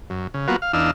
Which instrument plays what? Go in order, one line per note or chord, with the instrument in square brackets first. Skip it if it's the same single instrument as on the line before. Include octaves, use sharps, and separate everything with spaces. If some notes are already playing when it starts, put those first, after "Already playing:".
[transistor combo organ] F#2
C#3
F#3 A#3 B3 F4 F#4
F5
E2 D4 D#4 F5 E6